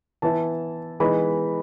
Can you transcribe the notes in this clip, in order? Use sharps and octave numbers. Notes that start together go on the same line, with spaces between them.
E3 B3 E4 A5
E3 G#3 B3 D#4 B5